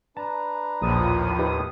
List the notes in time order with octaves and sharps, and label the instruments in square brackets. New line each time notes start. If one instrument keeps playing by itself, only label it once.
[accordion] D4 B4 A#5 [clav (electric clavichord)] A5
[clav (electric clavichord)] A#1 A5 [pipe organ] D#2 A2 D#6 [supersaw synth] F3
[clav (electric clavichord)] D#4 G4 B4